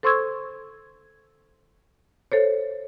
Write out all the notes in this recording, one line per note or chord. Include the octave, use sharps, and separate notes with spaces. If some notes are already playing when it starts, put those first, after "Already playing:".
A4 C5 C6 C#6 E6 G#6
A4 C5 C#5